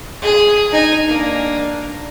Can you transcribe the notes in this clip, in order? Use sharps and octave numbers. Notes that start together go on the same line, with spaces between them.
G#4
D#4 G#5
A#3 D4